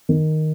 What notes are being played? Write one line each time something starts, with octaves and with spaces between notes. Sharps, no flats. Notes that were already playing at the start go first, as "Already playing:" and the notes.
D#3